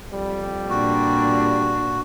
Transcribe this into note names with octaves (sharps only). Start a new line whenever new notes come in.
F2 G3
A#2 D4 F#4